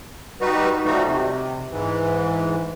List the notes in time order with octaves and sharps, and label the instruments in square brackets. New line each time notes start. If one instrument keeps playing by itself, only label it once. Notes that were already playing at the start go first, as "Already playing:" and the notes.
[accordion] G3 D#4 F#4 B4
F3 G3 A3 D#4 F#4
C3
G#2 E3